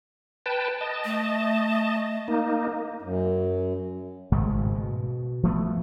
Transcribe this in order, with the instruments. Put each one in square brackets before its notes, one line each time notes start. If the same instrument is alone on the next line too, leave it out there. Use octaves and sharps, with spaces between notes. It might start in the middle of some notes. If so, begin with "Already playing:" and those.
[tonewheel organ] B4 G5 A5
D#5 A5
[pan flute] A3
[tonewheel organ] A#3 D#4
[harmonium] F#2
[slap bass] G#1 G#2 C#3 A3
B2
F3 A3 B3